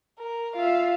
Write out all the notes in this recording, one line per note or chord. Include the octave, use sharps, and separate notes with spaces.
A#4
F4 E5 F5